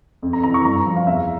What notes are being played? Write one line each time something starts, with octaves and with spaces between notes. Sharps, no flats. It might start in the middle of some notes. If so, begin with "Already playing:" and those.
F2
A#5
E3 A#5
C#6
G2 A#5
F3
F5
E2 E5